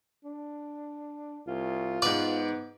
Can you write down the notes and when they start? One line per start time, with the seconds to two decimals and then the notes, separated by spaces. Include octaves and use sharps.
0.25 D4
1.47 C2 F4
2.02 G#2 B3 B4 D5 D6